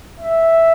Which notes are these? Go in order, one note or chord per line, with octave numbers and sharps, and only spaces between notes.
E5